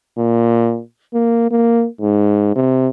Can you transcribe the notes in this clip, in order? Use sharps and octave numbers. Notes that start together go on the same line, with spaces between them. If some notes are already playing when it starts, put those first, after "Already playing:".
A#2
A#3
A#3
G#2
C3